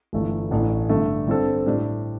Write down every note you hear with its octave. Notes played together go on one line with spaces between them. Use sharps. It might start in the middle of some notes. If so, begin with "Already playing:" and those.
G1 G2 E3 A3
A1 A2 A3 D4
G2 D3 A3
G2 D3 C4 A4
A2 G3 D4 G4